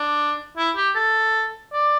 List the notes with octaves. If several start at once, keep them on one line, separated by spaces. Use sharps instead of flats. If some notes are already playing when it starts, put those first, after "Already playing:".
Already playing: D4
E4
G4
A4
D5